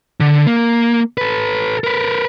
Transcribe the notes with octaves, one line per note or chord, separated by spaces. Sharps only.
D3
A#3
A4 B4
A#4 B4